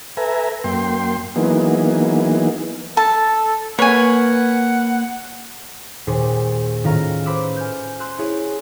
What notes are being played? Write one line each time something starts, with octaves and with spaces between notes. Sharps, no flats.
A4 B4 E5 G#5 A#5
F#2 A#3 G5 C6
E3 F#3 A#3 B3 D#4 G#4
A4 A5
A#3 B4 C#5 F#5 G#5
D#2 A#2 G#4 C5 C#6 C7
A2 D#3 C#4 F4 F5 A#5
B4 C5 B5 D6 E6
G#5 F6 G6
C6 E6 F#6 G6
E4 G#4 C#5